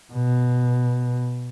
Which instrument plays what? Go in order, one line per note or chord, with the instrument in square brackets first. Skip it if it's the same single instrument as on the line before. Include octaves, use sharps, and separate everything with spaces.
[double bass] B2